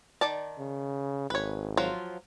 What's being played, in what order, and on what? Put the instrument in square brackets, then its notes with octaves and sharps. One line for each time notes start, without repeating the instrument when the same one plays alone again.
[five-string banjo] D#3 D5 A5
[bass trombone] C#3
[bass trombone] G#1 [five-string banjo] B4 C#5
[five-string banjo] F3 F#3 F4